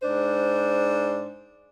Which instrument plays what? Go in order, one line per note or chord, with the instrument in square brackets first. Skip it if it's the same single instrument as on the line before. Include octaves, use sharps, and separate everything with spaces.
[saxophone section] G#2 D4 C5